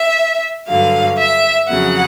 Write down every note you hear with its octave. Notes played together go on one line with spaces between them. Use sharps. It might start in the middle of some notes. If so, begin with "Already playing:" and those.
Already playing: E5
G2 D3 F#3 F5
E5
F2 C#3 F#3 F#5